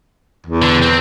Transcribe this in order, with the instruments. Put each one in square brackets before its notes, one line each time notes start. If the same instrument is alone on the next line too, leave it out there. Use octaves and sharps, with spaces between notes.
[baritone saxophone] E2
[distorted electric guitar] D3
C4